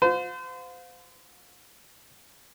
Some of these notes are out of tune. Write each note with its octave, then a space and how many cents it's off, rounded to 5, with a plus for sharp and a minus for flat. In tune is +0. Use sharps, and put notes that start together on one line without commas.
F4 +40 C5 -35